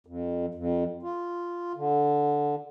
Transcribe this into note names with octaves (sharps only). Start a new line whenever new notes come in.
F2
F2
F4
D3